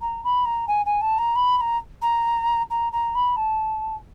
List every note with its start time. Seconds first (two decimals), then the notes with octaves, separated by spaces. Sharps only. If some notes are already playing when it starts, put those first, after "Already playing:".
0.01 A#5
0.24 B5
0.45 A#5
0.67 G#5
0.85 G#5
1.01 A5
1.18 A#5
1.35 B5
1.57 B5
1.60 A#5
2.02 A#5
2.70 A#5
2.92 A#5
3.15 B5
3.36 A5